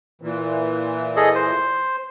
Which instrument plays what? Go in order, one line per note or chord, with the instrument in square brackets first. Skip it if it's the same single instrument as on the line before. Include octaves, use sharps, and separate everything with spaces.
[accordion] A#2 E3
[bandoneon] G#4 A4 D#5
C5